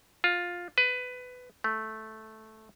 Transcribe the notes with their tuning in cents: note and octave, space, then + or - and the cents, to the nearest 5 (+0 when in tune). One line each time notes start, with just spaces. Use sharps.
F4 +10
B4 +15
A3 -5